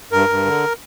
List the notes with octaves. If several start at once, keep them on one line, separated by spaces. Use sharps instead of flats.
G2 A#4
G2
D3